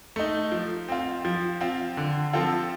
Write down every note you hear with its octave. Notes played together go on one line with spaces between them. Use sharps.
A3 D#4
F3
C4 F4
F3
C4 F4
D3
F3 C4 F4 A4